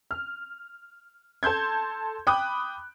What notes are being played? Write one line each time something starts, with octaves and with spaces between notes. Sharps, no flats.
F6
A4 A5 C6 G6 G#6
G5 B5 D6 D#6 F#6